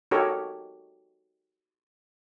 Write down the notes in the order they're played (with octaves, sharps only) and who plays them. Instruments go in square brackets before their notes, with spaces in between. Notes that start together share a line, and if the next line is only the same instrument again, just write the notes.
[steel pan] D#4 F#4 G4 A4 A#4 C#5